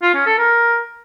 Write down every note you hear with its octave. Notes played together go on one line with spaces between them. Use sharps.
F4
C#4
A4
A#4